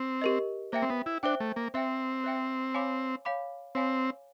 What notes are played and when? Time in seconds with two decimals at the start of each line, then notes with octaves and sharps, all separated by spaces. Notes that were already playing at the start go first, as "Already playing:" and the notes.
Already playing: C4
0.22 G4 A#4 D#5
0.72 A#3 C5 E5 G5
0.82 C4
0.90 B3
1.06 E4
1.23 D4 C5 E5 G5
1.40 A3
1.56 A#3
1.74 C4 C5 E5 G5
2.24 C5 E5 G5
2.74 C#5 F5 G#5 B5 D6
3.25 C#5 F5 G#5 B5 D6
3.75 C4 C#5 F5 G#5 B5 D6